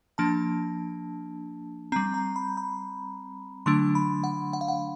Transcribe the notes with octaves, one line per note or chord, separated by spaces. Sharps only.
F3 A#3 D4 A5
G3 C4 A#5
A#5
B5
B5
D3 F#3 A3 D4 C6
B5
F#5
F#5
F5
F#5